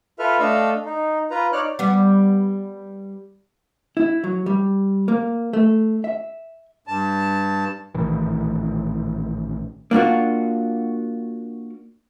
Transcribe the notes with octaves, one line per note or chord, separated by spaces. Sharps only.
F4 A4 B4 E5 F6
A3 D4 A4 D#5 F5 E6
D#4
F4 B4 A#5
D#4 C#5 D5 F6 F#6
G3 B3
E4
F#3
G3
A#3
A3
E5
G2 A5
A#1 A2 D#3 E3
A#3 D4 F4 F#4